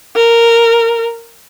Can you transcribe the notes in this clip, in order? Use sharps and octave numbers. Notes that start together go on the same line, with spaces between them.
A#4